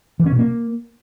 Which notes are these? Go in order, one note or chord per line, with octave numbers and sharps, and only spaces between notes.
E3
C#4
B2
A#3